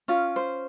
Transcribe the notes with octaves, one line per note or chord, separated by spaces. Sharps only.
C#4 F4
C5